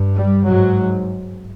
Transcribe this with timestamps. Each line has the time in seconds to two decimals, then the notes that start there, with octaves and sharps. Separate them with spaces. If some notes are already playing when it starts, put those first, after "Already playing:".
Already playing: G2
0.11 G3
0.44 G#2 F#3